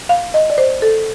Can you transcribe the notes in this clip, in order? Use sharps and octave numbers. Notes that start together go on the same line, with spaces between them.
F5
D#5
D5
C5
A4